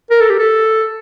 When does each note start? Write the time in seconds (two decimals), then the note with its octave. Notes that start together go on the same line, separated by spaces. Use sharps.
0.10 A#4
0.21 A4
0.30 G4
0.39 A4